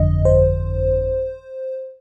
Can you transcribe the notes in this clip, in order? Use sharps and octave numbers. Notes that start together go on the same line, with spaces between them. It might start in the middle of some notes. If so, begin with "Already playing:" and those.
Already playing: G1 F2 D3 D#5
C5